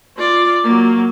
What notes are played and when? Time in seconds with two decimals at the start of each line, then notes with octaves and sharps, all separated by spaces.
0.17 F4 D5
0.64 F#3 A#3